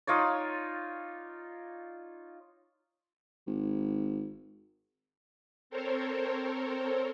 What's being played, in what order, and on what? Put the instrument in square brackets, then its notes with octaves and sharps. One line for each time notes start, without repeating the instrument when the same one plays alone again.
[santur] D#4 F4 C#5 D5
[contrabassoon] G#1
[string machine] C4 A4 A#4 C5 C#5